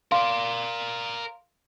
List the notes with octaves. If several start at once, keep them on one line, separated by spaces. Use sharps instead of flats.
A#4 D5 F5 C6